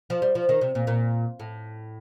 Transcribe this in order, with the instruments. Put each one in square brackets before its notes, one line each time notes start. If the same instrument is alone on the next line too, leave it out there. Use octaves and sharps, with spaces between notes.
[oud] F3
G3
F3
D#3
C3
A#2
A#2
A2